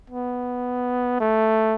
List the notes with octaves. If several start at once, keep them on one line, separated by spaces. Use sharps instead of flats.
B3
A3